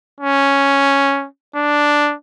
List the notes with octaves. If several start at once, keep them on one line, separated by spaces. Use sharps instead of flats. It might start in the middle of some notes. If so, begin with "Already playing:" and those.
C#4
D4